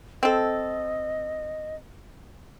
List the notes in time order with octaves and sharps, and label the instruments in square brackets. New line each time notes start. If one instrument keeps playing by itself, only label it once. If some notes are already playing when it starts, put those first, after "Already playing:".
[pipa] C4 A4 [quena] D#5